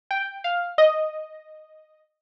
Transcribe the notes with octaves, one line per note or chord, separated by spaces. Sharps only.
G5
F5
D#5